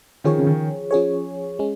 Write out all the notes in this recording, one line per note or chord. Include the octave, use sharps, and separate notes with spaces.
D#3 F3 C#4 G#4 C#5
C#3
D#3
F3 C#4 G#4 C#5
G#3 C#4